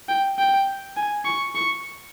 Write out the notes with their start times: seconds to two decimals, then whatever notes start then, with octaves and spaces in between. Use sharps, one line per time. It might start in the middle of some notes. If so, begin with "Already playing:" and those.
0.09 G5
0.39 G5
0.96 G#5
1.25 C#6
1.55 C#6